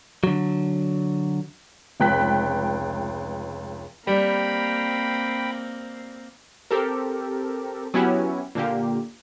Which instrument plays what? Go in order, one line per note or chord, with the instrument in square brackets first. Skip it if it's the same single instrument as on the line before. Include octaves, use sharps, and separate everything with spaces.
[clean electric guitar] D3 F#3
[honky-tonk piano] F1 C#2 G5 F#6 B6
[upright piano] G3 [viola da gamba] A#3 C4 [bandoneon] G5 B5
[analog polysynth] C4 G4 A4 A#4
F#3 B3 C#4 E4 F#4 G4
A#2 D3 A#3 G4